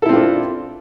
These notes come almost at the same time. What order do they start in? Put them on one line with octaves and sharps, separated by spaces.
A4 E4 C4 F4 D4